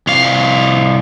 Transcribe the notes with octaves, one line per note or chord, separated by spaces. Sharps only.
C2 F5